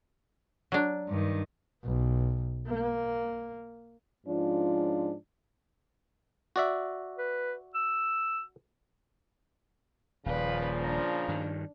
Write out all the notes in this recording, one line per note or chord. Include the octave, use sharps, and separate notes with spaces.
F#3 D4
G2 D#3
B1
A#3
G#2 F3 C#4 D4 F4
F#4 D5 E5
B4
E6
D#1 A#2 C#3 F3 B4 D5 F5
D4 A#5
G2 D#3